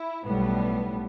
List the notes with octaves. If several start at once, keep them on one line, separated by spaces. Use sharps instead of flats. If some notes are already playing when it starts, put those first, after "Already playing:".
Already playing: E4
B1 A2 G3 B3